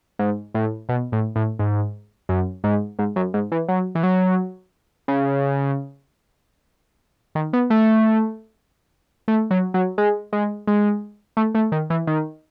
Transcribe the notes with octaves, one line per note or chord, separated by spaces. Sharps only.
G#2
A2
B2
A2
A2
G#2
F#2
G#2
G#2
F#2
G#2
E3
F#3
E3
F#3
C#3
D#3
B3
A3
A3
F#3
F#3
G#3
G#3
G#3
A3
A3
D#3
E3
D#3